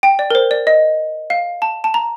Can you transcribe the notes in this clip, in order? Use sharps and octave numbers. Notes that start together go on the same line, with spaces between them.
G5
D5
A#4
C5
D5
D#5
F5
A5
A5
A#5